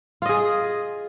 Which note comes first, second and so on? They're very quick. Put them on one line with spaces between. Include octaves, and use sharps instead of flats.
F4 D#5 G#4